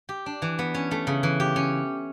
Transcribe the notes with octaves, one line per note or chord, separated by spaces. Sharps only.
G4
D4
E3
B3
C#4
A3
C#3
E3
G4
C#4